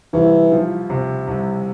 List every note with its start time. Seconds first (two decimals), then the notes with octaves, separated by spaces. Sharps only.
0.13 C2 E3
0.51 F3
0.90 C3
1.27 C2